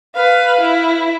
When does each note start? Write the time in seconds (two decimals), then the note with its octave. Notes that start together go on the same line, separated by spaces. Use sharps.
0.15 B4 F5
0.61 E4